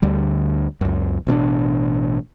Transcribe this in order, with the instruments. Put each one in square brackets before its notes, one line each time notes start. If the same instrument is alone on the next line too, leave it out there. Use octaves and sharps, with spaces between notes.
[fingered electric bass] D2 D3 G3
C#2 F#2
A1 B2 C#4 D4